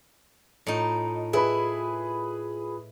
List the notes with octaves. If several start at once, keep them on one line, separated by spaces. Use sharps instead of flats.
A2 D#4 F4
E4 G#4 B4 B5